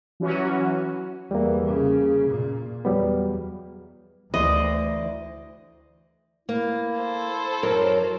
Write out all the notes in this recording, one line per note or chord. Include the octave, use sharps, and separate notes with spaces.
E3 F#3 C#4 F#4
E2 E3 G3 A#3
C#3
A#2
E2 F#3 G3 B3
D2 E3 C5 D5 D#5
A#3 E4
A4 C5
F#2 F#3 A#4